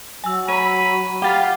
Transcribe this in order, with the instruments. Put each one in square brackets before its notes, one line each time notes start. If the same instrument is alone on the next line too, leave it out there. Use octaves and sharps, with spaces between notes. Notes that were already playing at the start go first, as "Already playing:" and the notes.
[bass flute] F#3 [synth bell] G#5 E6
[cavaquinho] C#5 [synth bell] A#5 D#7 [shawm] B5
[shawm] F4 [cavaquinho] G4 F5 B5 [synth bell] F#5 A6